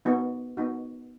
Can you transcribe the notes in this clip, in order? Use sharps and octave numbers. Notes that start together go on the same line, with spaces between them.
B3 D#4 F#4
B3 D#4 F#4